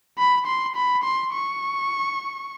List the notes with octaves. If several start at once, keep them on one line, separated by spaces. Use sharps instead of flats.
B5
C6
B5
C6
C#6